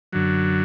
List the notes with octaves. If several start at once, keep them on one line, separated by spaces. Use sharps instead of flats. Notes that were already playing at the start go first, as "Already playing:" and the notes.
F#2 D3 F#3